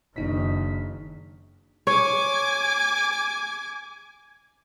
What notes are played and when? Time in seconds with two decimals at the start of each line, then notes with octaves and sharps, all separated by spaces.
0.16 F#1 D#3 D4 D#4 B6
1.87 C#5 G#5 D6